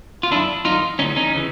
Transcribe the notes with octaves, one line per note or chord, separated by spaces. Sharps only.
F4
F#2 D#3 D4 E4
F#2 D#3 D#4 F4
D2 C#3 E3 C#4 D#4
C#4 D#4
C#3 E3